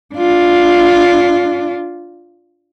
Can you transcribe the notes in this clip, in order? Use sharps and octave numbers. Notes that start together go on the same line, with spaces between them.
D4 F4